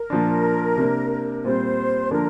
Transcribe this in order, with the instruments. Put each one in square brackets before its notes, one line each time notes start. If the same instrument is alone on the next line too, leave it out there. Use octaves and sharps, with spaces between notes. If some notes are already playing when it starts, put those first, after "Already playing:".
Already playing: [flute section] A#4
[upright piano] A#2 F3 D4
C3 A#3 D4
[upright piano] A#2 G3 C4 [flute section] C5
[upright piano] D3 F3 A#3 D4 [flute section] A#4